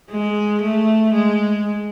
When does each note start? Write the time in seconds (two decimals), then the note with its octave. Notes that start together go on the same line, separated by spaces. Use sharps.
0.10 G#3
0.62 A3
1.14 G#3